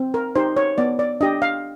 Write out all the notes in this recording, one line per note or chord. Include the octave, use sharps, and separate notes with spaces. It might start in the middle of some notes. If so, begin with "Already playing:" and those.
Already playing: C4
A#4
D#4 G4 C5
C#5
B3 D5
D5
D4 G4 D#5
F5